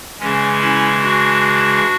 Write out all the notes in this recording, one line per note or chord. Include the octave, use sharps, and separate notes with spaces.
C#3 E3 G#3 C#4
C#4 E4
D4 F#4